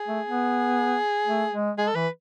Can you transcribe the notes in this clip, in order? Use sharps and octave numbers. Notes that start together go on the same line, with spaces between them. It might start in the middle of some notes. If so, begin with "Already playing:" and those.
Already playing: G#4
A3
B3
A3
G#3
G#3 G#4
A4
E3 B4